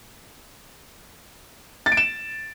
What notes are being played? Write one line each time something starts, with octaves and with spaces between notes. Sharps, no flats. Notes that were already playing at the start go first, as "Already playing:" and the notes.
A6
D7
E7